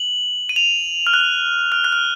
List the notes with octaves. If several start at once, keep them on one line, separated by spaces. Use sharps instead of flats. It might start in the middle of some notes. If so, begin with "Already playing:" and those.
Already playing: F#7
D#7
F7
F6
F#6
F6
F#6
F6